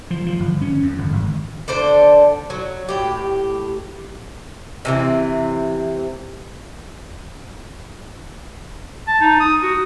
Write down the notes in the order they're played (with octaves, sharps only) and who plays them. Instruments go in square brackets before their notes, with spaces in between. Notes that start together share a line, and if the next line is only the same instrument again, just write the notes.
[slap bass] F3
F3
G1
C#4
F2
G1
G#1
[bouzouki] D3 D4 A4 C5
F#3
A2 G4
C3 E3 C4
[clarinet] A5
D#4
D#6
F#4